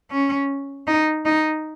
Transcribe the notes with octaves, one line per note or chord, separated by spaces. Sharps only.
C#4
D#4
D#4